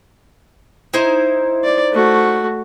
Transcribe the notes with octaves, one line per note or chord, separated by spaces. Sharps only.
D#4 E4 C5
D5
A3 F#4